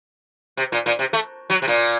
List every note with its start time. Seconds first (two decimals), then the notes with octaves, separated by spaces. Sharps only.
0.57 C3
0.72 A#2
0.86 A#2
0.99 C3
1.13 A3
1.50 F#3
1.62 C3
1.68 A#2